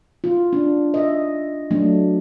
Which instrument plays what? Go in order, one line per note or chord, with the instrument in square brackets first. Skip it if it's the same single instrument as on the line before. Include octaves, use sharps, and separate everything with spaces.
[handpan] F4
D4
D#5 E5
F#3 A3 D4